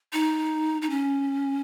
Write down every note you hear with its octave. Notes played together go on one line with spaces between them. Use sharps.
D#4
D#4
C#4